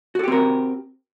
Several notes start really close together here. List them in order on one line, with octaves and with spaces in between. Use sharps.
F#4 A4 G4 C4 A#4